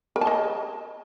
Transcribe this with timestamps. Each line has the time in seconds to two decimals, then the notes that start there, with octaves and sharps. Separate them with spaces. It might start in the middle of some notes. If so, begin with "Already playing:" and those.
0.16 A#4
0.21 A5
0.27 D#5